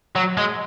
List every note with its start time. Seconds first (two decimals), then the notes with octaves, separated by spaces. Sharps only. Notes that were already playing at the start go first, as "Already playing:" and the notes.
0.16 F#3
0.37 G#3